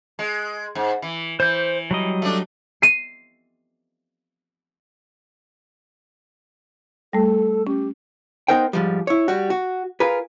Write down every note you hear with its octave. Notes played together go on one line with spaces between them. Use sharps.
G#3
G#2
E3
E3 C5 G6
F#3 G3 D#5
A3 D4
C7 D#7
G3 A3 A4
C#4 G4
B3 D#4 A#4 C5 G5
G#2 F3 G3
E4 C#5
G3 F#4
F#4
F4 G#4 A#4 B4